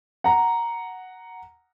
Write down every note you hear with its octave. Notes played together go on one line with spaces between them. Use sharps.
F#5 A#5